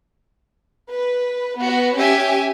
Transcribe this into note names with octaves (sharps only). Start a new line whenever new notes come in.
B4
B3 F#4
C#4 G4 E5 G#5